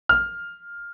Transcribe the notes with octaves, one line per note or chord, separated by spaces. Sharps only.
F6